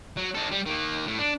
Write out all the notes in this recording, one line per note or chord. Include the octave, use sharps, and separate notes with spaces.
F#3
D#4 A4
G3
D#3 A#3
A2
D4